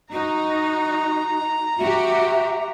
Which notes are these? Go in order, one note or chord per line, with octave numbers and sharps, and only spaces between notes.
D#4 F#4 A#5
F#4 G4 E5